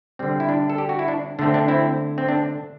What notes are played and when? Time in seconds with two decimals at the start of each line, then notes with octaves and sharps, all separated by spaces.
0.19 D3 G3 C4
0.40 E4
0.49 D4
0.70 A4
0.78 G4
0.89 F#4
0.99 E4
1.08 D4
1.39 D3 A3 C4 D4
1.54 D4
1.68 C4 E4
2.18 C4
2.28 D4